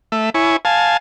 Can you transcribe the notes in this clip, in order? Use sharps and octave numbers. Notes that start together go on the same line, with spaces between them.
A3 E5
E4 C#5 G#5
F5 G#5 A5